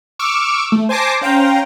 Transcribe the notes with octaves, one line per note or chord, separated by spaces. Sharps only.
C#6 D6 E6 F6
A3
C5 G#5 A5 D6 A#6 C7
C#4 C5 F5 G5 A#5